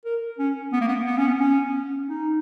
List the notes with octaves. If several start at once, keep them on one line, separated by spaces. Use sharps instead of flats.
A#4
C#4
B3
A#3
B3
B3
C#4
B3
C#4
D#4